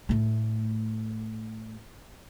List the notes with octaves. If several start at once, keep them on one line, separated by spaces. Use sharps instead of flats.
A2 A3